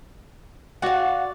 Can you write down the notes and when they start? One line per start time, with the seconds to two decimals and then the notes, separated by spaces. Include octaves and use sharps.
0.82 F#4 D5 F5 F#5